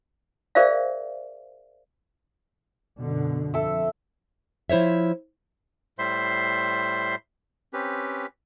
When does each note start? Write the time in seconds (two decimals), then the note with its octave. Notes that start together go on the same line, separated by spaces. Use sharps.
0.55 G#4 A#4 C5 D5 E5 F5
3.00 F#2 B2 D3
3.54 F2 A4 E5
4.70 F3 E4 C5 C#5 E5
5.99 A2 G3 C5 E5 C6
7.73 C4 C#4 G4 B4